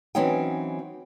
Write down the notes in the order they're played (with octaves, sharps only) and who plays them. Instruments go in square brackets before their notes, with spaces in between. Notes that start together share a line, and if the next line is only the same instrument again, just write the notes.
[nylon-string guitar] E3 F#3 C4 C#4 D#4 G5